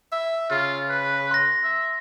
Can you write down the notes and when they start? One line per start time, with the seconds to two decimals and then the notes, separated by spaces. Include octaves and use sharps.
0.12 E5
0.50 C#3 F4
0.89 B4
1.31 C6 A#6
1.63 E5